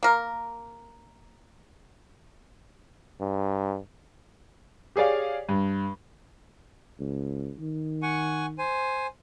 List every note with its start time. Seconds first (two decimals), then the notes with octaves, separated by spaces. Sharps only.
0.03 A#3 A#4
3.21 G2
4.96 G4 G#4 C#5 D5 F5
5.49 G2
7.00 C#2
7.60 D#3
8.03 F#5 G#5 C#6
8.59 C5 G#5